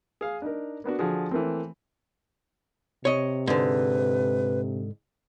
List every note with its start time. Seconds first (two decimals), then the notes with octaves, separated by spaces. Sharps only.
0.21 G#4 F5
0.42 D4 D#4 A#4
0.84 A#3 B3 D4 F#4
0.99 D3 F3 F#4 G#4
1.31 E3 A3 A#3 C4
3.05 C3 C#5 D#5
3.47 G#2 D3 B4